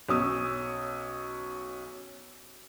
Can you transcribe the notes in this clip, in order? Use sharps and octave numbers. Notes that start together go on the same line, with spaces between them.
B1 C#4 D#6 E6